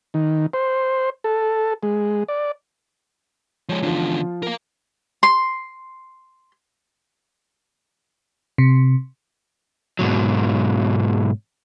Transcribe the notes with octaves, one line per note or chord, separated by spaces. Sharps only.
D#3
C5
A4
G#3
D5
F3 G#3 C#5
E2 D3 F3 F4
A#4 F5
C6
C3
G#2 B2 F#3